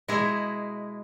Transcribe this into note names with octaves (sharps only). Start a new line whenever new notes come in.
B2 G#3 E4 G#4